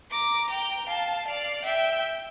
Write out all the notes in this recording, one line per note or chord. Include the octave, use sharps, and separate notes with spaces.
A#5 D6
G5 A#5
F5 A5
D5 F5
E5 G5